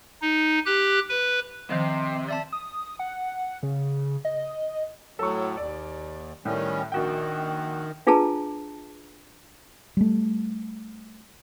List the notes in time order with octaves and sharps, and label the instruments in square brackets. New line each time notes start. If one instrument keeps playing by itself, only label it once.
[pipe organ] D#4
G4 F#6
B4
[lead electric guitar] C3 [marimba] D#3 F3 [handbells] D#5
[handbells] D5 E5 A5
[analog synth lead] D#6
F#5
C#3
D#5
[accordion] A2 F#3 [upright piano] A4 C#6
[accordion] D#2 [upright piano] D5
[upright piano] A2 [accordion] D#3 G3 C#4
[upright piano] A#1 F#4 G5 [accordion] D#3
[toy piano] D4 F4 G#4 B4 A5 A#5
[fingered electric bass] G3 A3